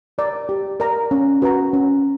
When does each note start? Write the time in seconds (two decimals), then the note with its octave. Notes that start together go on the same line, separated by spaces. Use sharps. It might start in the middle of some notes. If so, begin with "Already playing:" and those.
0.18 A#4 D5 A#5
0.49 G4
0.80 A#4 D5 A#5
1.11 C#4
1.42 F#4 B4 F#5 A#5
1.73 C#4